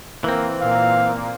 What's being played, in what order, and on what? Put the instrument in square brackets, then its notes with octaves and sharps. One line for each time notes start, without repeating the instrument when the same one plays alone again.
[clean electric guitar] E3 C4 [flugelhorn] A#3
[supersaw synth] A#2 A#3 [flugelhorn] F5